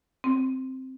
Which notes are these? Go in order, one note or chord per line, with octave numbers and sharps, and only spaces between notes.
C4